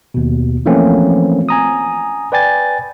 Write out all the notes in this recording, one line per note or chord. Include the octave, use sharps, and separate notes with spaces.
D#2 B2
E3 F3 A3 A#3 C4 C#4
G#5 A#5 D#6
B4 D5 G5 G#5 A6